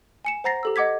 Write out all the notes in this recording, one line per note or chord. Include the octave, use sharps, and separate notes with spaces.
G#5 C#7 E7
C5 F#5 A#5 A6 A#6 C7
G4 A4 E6
D#5 F#5 D6 G#6 B6